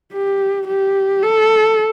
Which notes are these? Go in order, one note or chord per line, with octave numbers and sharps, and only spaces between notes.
G4
G4
A4